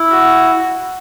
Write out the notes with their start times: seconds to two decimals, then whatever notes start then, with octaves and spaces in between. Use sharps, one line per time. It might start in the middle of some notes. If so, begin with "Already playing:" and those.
Already playing: E4
0.11 F#4